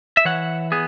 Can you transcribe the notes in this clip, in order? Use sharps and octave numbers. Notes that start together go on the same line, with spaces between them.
E5
E3 C#5 F#5
B3 G#4